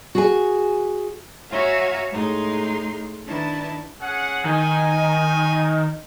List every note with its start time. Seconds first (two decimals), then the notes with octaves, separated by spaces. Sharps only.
0.15 F#4 G#4 G#5
1.50 F#4 C#5 E5 F5 G#5 A#5
2.10 A2 G#3 D#4 C6
3.27 D#3 D4 E4 B4 A5
4.01 C#4 G#4 F#5
4.45 D#3 D#4 G#5